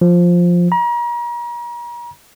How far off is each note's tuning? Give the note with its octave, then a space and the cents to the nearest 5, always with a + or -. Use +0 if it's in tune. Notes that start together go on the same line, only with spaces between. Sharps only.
F3 +5
A#5 +40